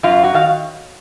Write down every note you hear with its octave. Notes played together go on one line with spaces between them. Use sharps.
F#2 F4
F#4
D#3 F5